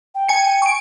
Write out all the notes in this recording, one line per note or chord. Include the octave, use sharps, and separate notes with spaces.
G5
G#5 C#7
C#6 D7